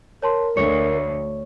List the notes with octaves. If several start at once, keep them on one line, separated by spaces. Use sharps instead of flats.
A#4 C#5 A5 C6
D2 C#5 C#7